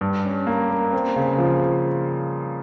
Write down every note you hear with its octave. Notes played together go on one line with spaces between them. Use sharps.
G2
C#4
A#3
A#3
C4
C#3
F3